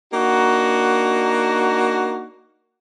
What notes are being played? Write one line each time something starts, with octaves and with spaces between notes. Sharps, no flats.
A#3 D4 D#4 F#4